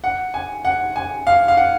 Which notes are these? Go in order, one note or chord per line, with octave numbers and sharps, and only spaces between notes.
F#5
G#5
F#5
G#5
F5
F5
F#5